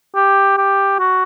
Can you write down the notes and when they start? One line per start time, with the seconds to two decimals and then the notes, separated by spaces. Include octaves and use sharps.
0.15 G4
0.57 G4
0.99 F#4